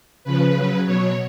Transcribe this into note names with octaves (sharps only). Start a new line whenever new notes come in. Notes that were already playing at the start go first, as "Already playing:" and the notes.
C#3 F3 B4
C#3 F#3
B2 F#3 C#5